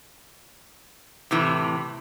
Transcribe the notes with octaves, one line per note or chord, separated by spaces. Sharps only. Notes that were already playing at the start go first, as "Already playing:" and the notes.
A2 C3 E3